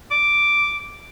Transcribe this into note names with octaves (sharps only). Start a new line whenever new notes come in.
D6